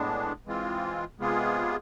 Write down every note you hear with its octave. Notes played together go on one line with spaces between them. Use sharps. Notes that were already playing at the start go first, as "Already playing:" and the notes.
Already playing: A2 G#3 B3 D4
E3 G#3 C4 F4
C3 G#3 B3 F4 G#4